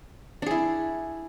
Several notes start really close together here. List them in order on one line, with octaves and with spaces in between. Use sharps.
D4 G#4 E4